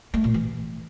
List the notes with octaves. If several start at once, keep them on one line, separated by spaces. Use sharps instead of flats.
A3
A#2
E3